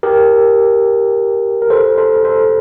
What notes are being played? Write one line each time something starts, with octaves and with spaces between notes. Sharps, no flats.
G4 A#4
A#4
A4 C5
A4 C5
A4 C5